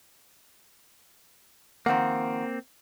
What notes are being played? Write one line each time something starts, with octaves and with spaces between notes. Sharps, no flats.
D#3 F3 A#3 C4 F#5